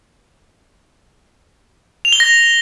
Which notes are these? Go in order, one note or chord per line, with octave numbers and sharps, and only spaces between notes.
F7
G7
A#6